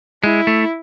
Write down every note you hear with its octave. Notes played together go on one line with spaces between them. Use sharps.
G#3 E4
A3